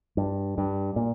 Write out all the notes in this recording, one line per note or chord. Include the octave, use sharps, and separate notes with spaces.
G2
G2
A#2